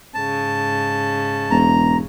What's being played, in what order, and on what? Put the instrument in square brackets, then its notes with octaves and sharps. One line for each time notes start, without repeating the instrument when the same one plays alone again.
[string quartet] G#2 C#3 [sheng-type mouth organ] A5
[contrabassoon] E1 [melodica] A#5